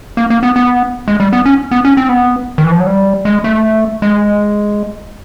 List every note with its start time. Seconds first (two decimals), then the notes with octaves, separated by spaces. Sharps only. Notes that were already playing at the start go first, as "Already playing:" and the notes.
0.17 A#3
0.30 A#3
0.43 B3
0.56 B3
1.08 G#3
1.20 G3
1.33 B3
1.45 C#4
1.71 B3
1.85 C#4
1.97 C4
2.09 B3
2.58 D#3
2.64 E3
2.72 F3
2.80 F#3
2.87 G3
3.25 G#3
3.44 A3
4.02 G#3